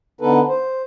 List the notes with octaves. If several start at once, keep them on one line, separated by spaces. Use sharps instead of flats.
D3 B3 D#4 A4 B4
C5